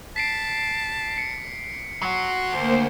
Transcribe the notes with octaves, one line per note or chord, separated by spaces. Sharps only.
A5 B6 C7 D7
C#7
F#3 F#4 C6
D2 A#3 C5